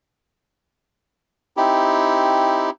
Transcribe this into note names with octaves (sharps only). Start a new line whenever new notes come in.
C4 D#4 E4 G4